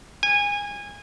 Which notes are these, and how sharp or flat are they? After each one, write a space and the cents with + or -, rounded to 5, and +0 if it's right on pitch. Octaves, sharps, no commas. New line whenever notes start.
G#5 -25